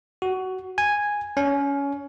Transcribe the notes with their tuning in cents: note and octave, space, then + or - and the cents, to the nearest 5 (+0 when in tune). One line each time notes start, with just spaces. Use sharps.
F#4 +15
G#5 -5
C#4 +20